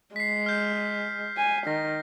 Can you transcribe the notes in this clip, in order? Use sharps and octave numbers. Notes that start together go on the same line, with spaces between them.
G#3 B6 C7
F6 G6
G#5
D#3 A#6